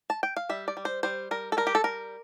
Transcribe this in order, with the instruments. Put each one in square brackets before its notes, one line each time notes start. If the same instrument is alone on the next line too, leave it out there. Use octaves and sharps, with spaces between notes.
[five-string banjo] A5
G5
F5
G3 E5
D5
G3
C5
G3 C5
G3 A#4
A4
G3 A#4
G4
A4
G3 A#4